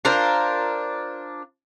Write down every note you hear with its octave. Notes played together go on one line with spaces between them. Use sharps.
D4 F4 A#4 C5